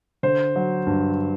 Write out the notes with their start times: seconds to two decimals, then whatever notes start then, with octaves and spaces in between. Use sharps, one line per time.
0.23 D3 C5
0.56 F#3
0.87 G2